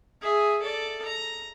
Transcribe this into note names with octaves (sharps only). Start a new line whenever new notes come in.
G#4 E5
A4 D5
A#5